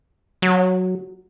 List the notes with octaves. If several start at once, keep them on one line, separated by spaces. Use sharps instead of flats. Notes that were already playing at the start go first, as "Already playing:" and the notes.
F#3